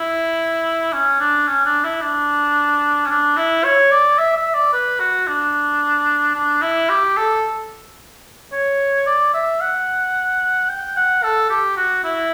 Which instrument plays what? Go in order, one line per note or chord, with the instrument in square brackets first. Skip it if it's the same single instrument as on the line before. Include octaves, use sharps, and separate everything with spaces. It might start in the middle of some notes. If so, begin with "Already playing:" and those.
Already playing: [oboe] E4
C#4
D4
C#4
D4
E4
D4
C#4
D4
E4
C#5
D5
E5
E5
D5
B4
F#4
D4
D4
E4
G4
A4
C#5
D5
E5
F#5
G5
F#5
A4
G4
F#4
E4